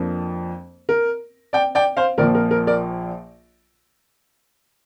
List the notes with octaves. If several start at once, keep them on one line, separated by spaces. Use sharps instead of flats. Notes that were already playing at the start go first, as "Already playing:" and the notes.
Already playing: F2 F3 A#3 D4
A#4
D5 G5
D5 G5
C5 F5
A#1 A#2 F3 A#4 D5
A#4
A#4
A#4 D5